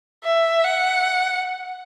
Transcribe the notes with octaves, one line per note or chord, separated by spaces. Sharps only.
E5
F#5